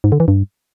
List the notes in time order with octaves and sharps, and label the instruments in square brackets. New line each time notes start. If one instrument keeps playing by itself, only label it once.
[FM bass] G#2
D3
E3
G2